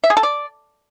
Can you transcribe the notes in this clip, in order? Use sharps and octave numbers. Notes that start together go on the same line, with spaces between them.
E5
G#4
A4
D5